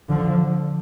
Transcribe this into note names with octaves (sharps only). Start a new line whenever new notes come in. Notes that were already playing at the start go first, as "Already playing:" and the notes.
D3 F3